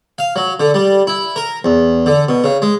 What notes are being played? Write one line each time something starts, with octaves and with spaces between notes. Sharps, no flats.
F5
F#3
D3
G3
E4
A#4
E2
D3
B2
C#3
G#3